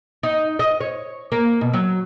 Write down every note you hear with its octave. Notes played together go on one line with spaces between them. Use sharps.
D#4
D#5
C#5
A#3
B2
F#3